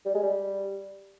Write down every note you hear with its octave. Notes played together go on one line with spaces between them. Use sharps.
G3
G#3
G3